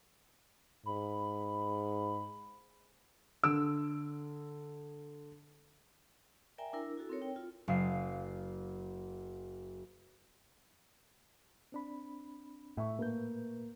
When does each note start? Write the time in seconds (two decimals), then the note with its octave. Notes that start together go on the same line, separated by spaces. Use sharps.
0.86 G#2 B5
3.43 D3 E6 D7
6.58 A#4 D5 E5 G5 G#5 A#5
6.73 D4 E4 A#4
6.98 E4 F#4 A4
7.09 C4 D#4 A#4 C#5
7.22 G5
7.36 F4
7.68 F#1 F5 D#6 C7
11.72 C4 D4 B5
12.77 A2 E5 C#6
12.99 A#2 A#3 B4 G6